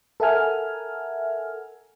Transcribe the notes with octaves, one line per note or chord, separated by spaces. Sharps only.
A4 A#4 E5 F#5 G#5 F6